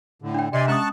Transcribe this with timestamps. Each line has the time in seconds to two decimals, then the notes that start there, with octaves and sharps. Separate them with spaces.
0.22 A2 D3
0.34 D4 G5
0.53 C3 D5 D#5 G#5 C6
0.68 G#3 C#4 A5 A#5 C#6 D#6 F#6